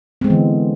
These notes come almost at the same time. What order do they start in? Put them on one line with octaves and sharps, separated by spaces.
C4 G#3 B3 E3 D3